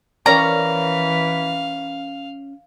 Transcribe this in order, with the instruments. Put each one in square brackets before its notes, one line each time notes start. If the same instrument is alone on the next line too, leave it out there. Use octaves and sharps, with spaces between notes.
[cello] E3 [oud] C#4 A#4 D5 [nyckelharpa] F5 [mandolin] A#5